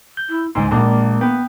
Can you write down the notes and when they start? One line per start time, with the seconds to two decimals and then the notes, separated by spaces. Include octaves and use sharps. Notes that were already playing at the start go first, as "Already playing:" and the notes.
0.17 G6
0.29 E4
0.55 C#2 G#2 D#4 G#5 C6
0.71 A#1 G#3 A#3 D5 A5
1.21 B3 G5